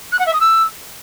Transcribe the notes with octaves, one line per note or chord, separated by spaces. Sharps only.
F#6
F#5
E5
D#6
E6